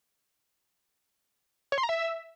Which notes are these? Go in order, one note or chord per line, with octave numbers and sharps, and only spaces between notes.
C#5
C6
A#5
E5